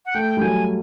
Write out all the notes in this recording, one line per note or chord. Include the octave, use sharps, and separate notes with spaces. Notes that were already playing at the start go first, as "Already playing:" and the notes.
F#5
A3 G5
G3
F#3 G#5